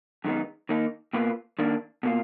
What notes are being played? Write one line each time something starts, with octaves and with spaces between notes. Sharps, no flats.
F#2 D#3 G#3 B3 D#4
D#3 A#3 D#4
B2 A#3 F4 B4
D#3 A#3 D4
B2 A#3 F4